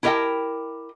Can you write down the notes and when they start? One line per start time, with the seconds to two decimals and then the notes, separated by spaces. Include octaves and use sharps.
0.03 E4 G4 A#4 D#5 G5 A5